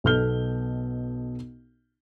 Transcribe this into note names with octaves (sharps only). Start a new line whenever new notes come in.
B1 B2 A4 F6 G6 G7